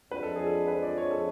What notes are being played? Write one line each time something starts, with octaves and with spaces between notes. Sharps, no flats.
F2 F3 G#3 D4 B4
A4
G#4
A4
B4
D5
C#5
A4